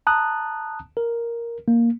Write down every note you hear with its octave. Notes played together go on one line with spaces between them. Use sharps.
A5 A#5 D#6 F#6
A#4
A#3